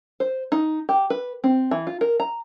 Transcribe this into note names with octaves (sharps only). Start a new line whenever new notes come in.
C5
D#4
G4
B4
C4
E3
F4
A#4
A#5